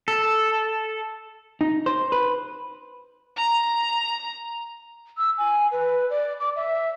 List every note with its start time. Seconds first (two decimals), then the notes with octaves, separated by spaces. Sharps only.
0.08 A4
1.61 D#4
1.86 C5
2.12 B4
3.37 A#5
5.18 E6
5.38 G#5
5.71 B4
6.10 D5
6.40 D6
6.56 E5